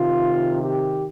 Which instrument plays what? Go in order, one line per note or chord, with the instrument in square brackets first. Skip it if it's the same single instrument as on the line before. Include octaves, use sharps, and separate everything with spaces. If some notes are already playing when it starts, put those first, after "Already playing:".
Already playing: [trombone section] C3 D#3 F4
G4